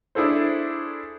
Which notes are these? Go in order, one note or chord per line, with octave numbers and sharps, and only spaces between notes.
D4 E4 G#4 A4 C5